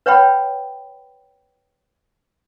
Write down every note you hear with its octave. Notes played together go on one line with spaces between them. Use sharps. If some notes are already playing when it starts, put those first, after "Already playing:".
B4 C#5 F#5 G5 B5